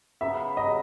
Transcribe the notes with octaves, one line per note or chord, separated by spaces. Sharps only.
C#3 F#3 B3 E5
C#3 F#3 B3 D#5